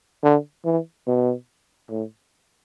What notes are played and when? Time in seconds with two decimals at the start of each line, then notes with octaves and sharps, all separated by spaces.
0.23 D3
0.65 E3
1.07 B2
1.90 A2